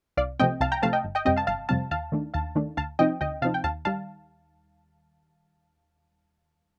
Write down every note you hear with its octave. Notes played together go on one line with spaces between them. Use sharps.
C2 D5 F5
C3 F3 A3 C4 D#5 G5
C2 F5 A5
G5 A#5
C3 F3 A3 C4 F5 A5
D#5 G5
G1
D#5 G5
F2 C3 G3 C4 D#5 G5
F5 A5
G1 F5 A5
F2 C3 G3 C4 F5 A5
D#2 F5 A5
D#3 A3 D4
D#2 F5 A5
D#3 A3 D4
D2 F5 A5
C3 F3 C4 D#4 D#5 G5
D2 D#5 G5
C3 F3 C4 D#4 F5 A5
G5
D#2 F5 A5
D#3 G3 F5 A5